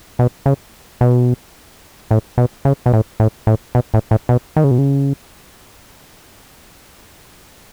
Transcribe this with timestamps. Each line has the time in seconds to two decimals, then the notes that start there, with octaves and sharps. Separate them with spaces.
0.19 B2
0.46 C#3
1.01 B2
2.11 A2
2.38 B2
2.65 C#3
2.86 B2
2.93 A2
3.20 A2
3.47 A2
3.75 B2
3.94 A2
4.11 A2
4.29 B2
4.56 D#3
4.64 C#3
4.71 B2
4.78 C#3